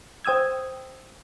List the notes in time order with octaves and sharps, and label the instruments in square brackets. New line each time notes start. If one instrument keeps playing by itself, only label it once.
[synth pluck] C5 G5 D#6 E6 G#6